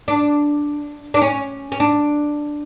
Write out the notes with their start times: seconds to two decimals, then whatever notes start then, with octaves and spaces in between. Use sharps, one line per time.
0.08 D4
1.14 D4
1.21 C#4
1.72 C#4
1.80 D4